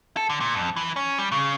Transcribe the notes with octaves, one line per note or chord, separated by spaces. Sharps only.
A4
D3
A#2
F2
E3
C#4
G3
C#3